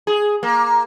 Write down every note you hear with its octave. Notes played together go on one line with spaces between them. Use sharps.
G#4
A#3